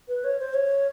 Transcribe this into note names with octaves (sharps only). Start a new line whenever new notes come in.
B4
C#5
C5
C#5